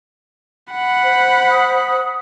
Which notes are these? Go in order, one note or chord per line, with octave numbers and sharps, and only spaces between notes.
F#5 B5
C5
D#6